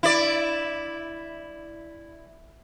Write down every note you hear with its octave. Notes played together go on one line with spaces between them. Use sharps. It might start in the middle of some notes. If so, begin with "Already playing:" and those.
E4 D5